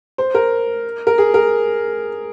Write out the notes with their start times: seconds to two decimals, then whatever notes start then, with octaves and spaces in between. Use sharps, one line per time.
0.18 C5
0.35 A#4
1.07 A#4
1.18 G#4
1.34 A#4